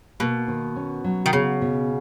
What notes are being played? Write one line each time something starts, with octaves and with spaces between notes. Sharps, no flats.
B2 A#3
D#3
C#4
F#3
D#3
C#3 B3
B2